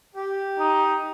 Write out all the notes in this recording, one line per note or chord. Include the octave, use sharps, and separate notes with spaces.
G4
D#4